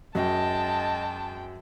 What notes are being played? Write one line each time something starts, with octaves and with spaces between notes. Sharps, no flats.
F#2 G#3 D#5 G5 A5